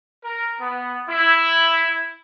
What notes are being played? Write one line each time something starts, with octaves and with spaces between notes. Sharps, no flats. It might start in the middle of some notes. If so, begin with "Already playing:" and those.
A#4
B3
E4